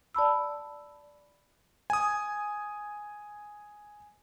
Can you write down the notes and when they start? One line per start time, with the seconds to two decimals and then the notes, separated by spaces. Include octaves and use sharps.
0.14 D5 A5 B5 E6
1.90 G#5 D#6